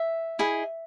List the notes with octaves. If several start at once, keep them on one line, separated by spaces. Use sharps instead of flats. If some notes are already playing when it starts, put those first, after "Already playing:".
Already playing: E5
E4 G#4 D#5